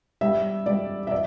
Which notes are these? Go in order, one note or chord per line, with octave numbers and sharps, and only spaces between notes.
G3 E5
G3 D5
E5
D5